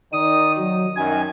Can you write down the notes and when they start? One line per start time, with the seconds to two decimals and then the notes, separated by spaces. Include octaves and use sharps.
0.13 D#3 D#4 D5 D#6
0.58 F#3
0.96 F#2 D#3 G#5